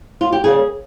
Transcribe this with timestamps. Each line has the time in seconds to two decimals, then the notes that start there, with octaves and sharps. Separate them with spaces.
0.21 F4
0.32 G4
0.44 C#3 G3 A#3 C#4 G#4